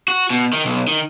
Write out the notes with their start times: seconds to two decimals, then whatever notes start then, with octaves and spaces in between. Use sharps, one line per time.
0.08 F#4
0.30 B2
0.53 D#3
0.65 B1
0.87 D#3